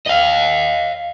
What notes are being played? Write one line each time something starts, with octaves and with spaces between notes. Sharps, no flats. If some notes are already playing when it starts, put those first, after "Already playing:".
D#5 F5